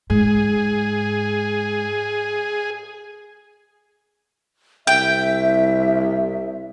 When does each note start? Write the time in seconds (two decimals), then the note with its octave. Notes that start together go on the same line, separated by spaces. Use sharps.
0.10 G#2 G#4
4.87 C2 E5 G5